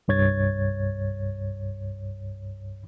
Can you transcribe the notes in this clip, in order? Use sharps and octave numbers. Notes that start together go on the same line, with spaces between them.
C2 G2 C#5 G#6 A6